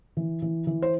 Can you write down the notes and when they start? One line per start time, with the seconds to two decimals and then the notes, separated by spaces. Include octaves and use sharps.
0.17 E3
0.42 E3
0.67 E3
0.82 C5